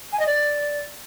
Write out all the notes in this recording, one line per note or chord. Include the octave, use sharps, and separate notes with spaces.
G#5
D#5
D5